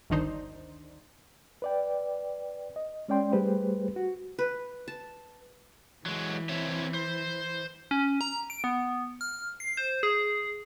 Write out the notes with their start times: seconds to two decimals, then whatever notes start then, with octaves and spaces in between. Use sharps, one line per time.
0.10 G1 D2 D#3 D4 D#4 C5
1.62 B4 D5 G5
2.76 D#5
3.08 G#3 C#4 D5 G5 C6
3.32 G3 A3 G4 G#4 B4 C5
3.96 F#4
4.39 B4
4.88 A5
6.06 E3 F#3 G#3
6.49 C4 C#5 E5
6.94 C5
7.91 C#4
8.21 A#5
8.50 D7
8.64 B3
9.21 F6
9.60 C7
9.77 C5
10.03 G#4